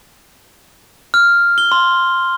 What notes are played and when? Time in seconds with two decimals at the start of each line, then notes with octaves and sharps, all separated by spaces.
1.14 F6
1.58 G7
1.72 C6